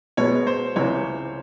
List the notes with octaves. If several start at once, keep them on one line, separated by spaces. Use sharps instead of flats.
B2 G#3 B3 C#5
C5
C#2 C3 E3 C#5